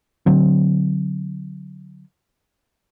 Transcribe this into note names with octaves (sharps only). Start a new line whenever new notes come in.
D3 F#3 C4